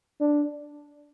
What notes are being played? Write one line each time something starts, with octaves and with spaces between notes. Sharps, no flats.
D4